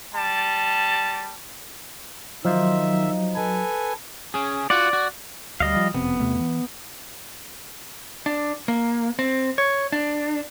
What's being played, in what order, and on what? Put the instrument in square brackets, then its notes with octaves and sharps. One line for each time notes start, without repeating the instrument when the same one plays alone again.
[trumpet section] G3 A5
[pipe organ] D#3 E5 [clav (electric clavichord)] F3 F4 [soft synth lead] F#3 [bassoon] D#4
[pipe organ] A4 B4 G#5
[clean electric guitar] C#4 G#4
[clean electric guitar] F4 F#4 F#5 [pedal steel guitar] D5
[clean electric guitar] F#4
[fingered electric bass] D2 [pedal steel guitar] G3 D#5 F5
[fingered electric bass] F3
[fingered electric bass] F#1 F2 C3 [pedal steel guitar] B3
[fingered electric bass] E2 C3 A3
E3
[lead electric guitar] D4
A#3
C4
C#5
D4